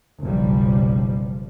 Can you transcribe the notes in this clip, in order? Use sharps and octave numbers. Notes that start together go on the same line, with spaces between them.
F#1 B1 F3 G3